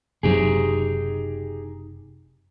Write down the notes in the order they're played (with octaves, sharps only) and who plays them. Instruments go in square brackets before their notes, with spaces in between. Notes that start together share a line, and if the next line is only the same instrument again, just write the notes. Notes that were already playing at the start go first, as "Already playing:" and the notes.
[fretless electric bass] F#1 C3 F#3 [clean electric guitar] D#4 G4 G#4